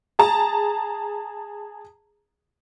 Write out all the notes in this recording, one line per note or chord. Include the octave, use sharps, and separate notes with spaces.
G#4 A5 A#5